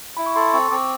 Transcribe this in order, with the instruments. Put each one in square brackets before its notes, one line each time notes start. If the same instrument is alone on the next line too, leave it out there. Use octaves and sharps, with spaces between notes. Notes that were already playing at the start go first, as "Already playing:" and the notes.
[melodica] E4 [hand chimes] B5
[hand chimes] C#6
[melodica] A4 [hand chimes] C6
[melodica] C4 [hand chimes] C#6
[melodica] C4 [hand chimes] D6